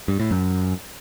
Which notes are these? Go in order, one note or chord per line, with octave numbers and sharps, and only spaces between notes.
G2
A2
F#2